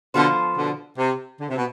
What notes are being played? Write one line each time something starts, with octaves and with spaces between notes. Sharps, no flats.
B2 D3 F3 B3 F4 A4 C5
B2 D3
C3
D3
C3
B2